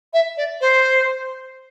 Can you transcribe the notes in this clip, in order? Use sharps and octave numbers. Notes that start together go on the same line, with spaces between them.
E5
D5
C5